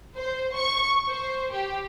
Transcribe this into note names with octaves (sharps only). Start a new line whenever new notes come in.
C5
C#6
C5
G4